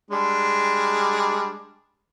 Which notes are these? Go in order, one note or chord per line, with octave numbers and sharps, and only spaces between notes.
G3 G#3 D4